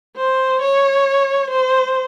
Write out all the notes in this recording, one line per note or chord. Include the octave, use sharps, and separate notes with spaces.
C5
C#5
C5